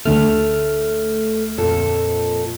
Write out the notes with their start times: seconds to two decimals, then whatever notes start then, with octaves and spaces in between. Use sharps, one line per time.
0.05 D2 A3 F6
1.58 F2 A#2 A4